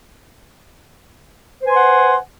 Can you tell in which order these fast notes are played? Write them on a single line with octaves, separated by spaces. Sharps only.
C5 B4 G#5 C6 F#5